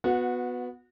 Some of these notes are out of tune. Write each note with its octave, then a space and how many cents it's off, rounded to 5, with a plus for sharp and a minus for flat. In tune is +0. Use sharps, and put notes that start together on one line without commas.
B3 +5 F#4 -25 F#5 -10